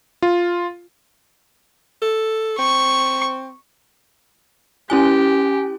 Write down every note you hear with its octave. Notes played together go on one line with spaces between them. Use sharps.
F4
A4
C4 C#6
C#4 E4 G4 G#5